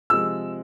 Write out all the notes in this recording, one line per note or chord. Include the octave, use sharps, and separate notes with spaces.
C3 F3 G#3 E6